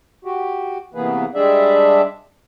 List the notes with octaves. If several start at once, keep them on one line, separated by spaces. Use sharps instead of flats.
F#4 G4
C3 E3 A#3 B3 G#4 B4
G3 G#3 D4 G#4 D5 E5